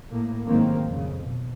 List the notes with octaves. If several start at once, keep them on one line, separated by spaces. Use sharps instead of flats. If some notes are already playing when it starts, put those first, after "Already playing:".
A2 A#3
A1 G#2 D#3 F#3 A#3 C4
F2 C#3
B2